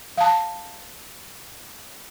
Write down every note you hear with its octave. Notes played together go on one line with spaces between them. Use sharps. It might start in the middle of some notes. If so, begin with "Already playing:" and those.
F5 A5